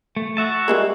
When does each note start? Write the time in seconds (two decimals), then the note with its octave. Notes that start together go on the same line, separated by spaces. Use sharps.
0.17 A3
0.37 F#4 E5 A5
0.68 G3 G#3 A#3